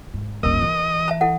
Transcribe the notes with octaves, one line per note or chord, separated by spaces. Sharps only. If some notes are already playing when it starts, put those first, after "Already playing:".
G#2
D#1 G#1 A#4 D#5 A#5
E3
E5 A5 A#5
E4 A4 F#5